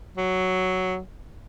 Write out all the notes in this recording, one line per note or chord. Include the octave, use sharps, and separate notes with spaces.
F#3